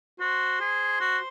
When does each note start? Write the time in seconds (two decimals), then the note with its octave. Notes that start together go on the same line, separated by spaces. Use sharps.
0.20 F#4 C5
0.61 G#4
1.00 F#4